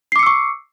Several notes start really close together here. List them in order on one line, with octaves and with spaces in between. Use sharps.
C7 D6 C#7 E6 C#6